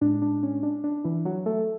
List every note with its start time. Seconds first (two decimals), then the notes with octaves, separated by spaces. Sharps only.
0.01 A2 G#3 D4
0.22 D4
0.43 C#4
0.63 D4
0.84 D4
1.04 E3 E4
1.25 F#3 F#4
1.46 A3 A4